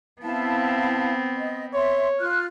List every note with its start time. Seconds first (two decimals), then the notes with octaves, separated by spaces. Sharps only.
0.22 B3 C4 E4 F5 A5
1.36 D#5
1.74 C#5 E5 C6
2.19 F4 F6 F#6